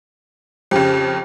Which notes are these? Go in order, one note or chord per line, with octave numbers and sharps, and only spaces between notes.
F2 C#3 G4 A#5